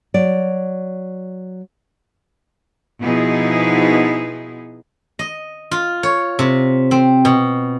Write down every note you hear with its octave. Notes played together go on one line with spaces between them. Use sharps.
F#3 D5
B2 F3 B3 D#4 E4 G#4
D#5
F4
C#5
C3
C4
B2